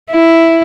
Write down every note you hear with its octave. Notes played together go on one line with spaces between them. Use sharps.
E4